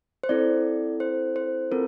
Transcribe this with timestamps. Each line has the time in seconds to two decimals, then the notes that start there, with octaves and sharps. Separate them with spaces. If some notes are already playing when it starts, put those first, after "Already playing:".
0.23 C5
0.29 C4 E4 A4 D5
1.00 C5
1.36 C5
1.71 C4 F4 A4 A#4